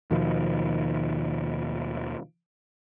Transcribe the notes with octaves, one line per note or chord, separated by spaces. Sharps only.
D#2 B2 D#3 F3